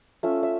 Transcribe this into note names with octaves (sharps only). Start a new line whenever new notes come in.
A3 C#4 F4 E5
E5